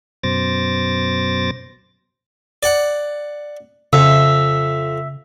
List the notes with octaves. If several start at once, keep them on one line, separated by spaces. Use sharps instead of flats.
F#2 B2 C5 D6 A6 A#6
D5 F#5
F2 C#3 E5